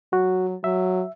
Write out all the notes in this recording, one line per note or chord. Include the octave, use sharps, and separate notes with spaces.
F#3 F#4
F#3 E5